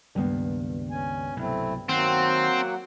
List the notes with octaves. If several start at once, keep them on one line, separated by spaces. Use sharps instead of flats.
C#2 G2 D#3 A#3 B3
C#4 G#5
C2 B2 F#3 A3 C4 E4
D#3 F#3 A#3 C4 F#5